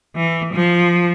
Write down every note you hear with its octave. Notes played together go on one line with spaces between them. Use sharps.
E3
F3